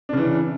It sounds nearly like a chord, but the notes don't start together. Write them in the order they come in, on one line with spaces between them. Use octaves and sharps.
D4 C#3 E3